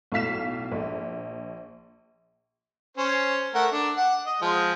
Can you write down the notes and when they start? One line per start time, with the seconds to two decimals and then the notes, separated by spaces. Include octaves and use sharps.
0.12 B1 A2 F5 B6 E7
0.72 A#1
2.97 C#4 C5
3.54 A3 A#4 F#5
3.71 D4
3.97 F#5
4.26 D#5
4.41 F3 G#3